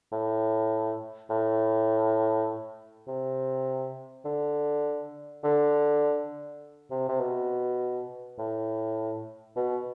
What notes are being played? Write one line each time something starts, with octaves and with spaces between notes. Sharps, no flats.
A2
A2
C3
D3
D3
C3
C3
B2
A2
B2